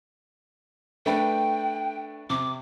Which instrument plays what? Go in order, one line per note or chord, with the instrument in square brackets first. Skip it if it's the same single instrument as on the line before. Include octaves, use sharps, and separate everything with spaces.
[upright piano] A3 D4 B4 [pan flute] G5
[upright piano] C3 [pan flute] D6